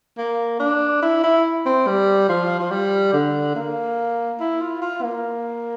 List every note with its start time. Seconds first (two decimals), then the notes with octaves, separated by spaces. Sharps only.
0.18 A#3
0.60 D4
1.02 E4
1.24 E4
1.66 C4
1.87 G3
2.29 F3
2.60 F3
2.71 G3
3.13 D3
3.55 A#3
4.40 E4
4.61 F4
4.82 F4
5.03 A#3